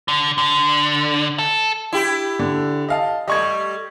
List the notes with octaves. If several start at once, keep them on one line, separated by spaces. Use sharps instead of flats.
D3
D3
A4
E4 G4
D3
D#5 F5 A5
G3 A3 D#5 C#6 G#6